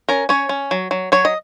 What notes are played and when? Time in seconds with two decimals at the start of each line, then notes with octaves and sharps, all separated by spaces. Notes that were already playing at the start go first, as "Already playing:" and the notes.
0.09 C#4 A#4
0.29 C#4 C#5
0.49 C#4
0.71 F#3
0.91 F#3
1.12 F#3 C#5
1.25 D#5